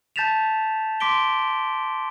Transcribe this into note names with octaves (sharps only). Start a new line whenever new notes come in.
A5 G6 A6 B6 E7 F7
C6 D6 B6 D7 G7